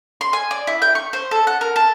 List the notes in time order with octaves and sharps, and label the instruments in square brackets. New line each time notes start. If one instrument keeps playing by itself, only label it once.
[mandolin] C6
G#5
D5
E4
G5
C#6
C5
A4
F#5
A#4
A4